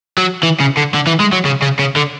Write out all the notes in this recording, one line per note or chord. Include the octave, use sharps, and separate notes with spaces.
F#3
E3
C#3
D3
D3
E3
G#3
F#3
C#3
C#3
C#3
D3